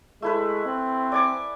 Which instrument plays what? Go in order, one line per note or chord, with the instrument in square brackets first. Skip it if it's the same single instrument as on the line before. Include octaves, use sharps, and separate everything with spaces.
[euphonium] G#3 [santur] A3 E4 B4
[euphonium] C4
[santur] D5 G#5 D6